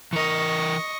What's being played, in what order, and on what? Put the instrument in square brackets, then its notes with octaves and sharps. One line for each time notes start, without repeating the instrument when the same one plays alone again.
[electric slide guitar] E3 A#4 [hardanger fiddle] D#5 C#6